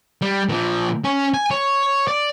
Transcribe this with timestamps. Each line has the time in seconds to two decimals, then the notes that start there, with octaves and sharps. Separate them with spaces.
0.22 G3
0.49 A#2 F3
1.04 C#4
1.34 G#5
1.51 C#5
2.07 D5